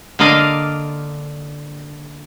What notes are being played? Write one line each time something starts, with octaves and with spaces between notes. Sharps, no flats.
D3 A#3 D5 D#5 F5